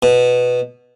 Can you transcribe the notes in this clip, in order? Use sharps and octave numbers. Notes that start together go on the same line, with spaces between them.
B2